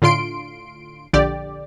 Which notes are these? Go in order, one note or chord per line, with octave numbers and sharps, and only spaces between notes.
A2 D3 F4 C6 D7
A#1 D3 G4 D5